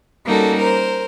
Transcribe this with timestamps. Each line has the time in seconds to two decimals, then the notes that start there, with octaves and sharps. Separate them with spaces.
0.25 G3 A#3 C#4 D#4 F#4 A4
0.59 A#4 C5